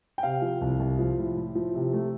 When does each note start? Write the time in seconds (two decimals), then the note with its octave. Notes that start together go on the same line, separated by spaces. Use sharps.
0.18 G5
0.23 C3 F5
0.42 F3
0.61 C2
0.80 C2
0.99 F3
1.18 A2
1.37 A2
1.55 F3
1.75 C3
1.93 A3